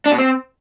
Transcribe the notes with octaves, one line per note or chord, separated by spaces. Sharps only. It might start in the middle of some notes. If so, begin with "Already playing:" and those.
D4
B2
C4